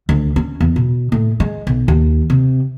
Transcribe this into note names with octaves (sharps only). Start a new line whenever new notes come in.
D2
C#4
E2
B2
A2
G#3
B1
D#2
C3